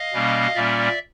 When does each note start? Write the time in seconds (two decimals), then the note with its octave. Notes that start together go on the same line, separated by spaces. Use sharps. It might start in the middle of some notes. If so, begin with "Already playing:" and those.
Already playing: D#5 F5
0.13 B2 G3 A#3 C#4
0.55 A#2 G3 A#3 C#4 D5 E5